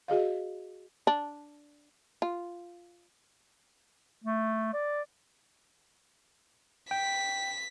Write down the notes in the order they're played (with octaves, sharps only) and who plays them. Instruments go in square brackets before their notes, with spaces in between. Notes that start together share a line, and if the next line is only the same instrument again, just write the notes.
[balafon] F#4 G#4 D#5 F5
[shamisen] D4
F4
[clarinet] A3
D5
[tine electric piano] G5 [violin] B6